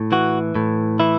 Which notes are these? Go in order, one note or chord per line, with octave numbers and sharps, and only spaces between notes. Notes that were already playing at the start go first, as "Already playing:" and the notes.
Already playing: A2
E3 F#4
A2
E3 E4